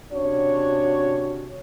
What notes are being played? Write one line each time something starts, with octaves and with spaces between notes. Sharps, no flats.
C3 C#4 D4 F#4 C#5